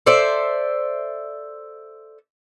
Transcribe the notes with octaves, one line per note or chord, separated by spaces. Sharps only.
A4 C5 D5 E5